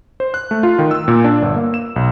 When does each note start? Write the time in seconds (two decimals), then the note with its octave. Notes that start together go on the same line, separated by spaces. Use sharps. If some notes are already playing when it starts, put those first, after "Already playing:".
0.20 C5
0.34 F#6
0.51 A3
0.63 F4
0.79 D#3
0.91 E6
1.08 A#2
1.24 D4
1.42 G1
1.56 A#3
1.74 E7
1.96 B1